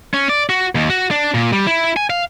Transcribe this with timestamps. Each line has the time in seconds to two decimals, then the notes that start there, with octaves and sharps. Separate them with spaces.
0.14 C#4
0.29 D5
0.49 F#4
0.75 D#2
0.90 F#4
1.11 D4
1.34 A#2
1.53 G3
1.67 E4
1.96 G#5
2.10 F5